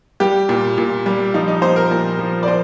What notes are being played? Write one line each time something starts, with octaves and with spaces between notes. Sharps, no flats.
G3 G4
A#2
A#2
G3
F3 D#4
D#4
A#2 C5
A#4
A#2 A#4
F3
D5
F3 C5